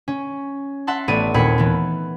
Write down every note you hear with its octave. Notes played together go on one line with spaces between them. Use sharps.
C#4
E5 F#5 A5 C6
A1 A3 B3 C#5 D5 D#7
D#2 A#2 C4 B5 G#6 C#7
E3 B3